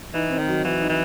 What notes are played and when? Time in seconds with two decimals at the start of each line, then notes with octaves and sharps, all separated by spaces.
0.14 E3 D#4
0.30 C4
0.38 D#3
0.48 F#3
0.64 E3 F#4
0.80 D#4
0.89 E3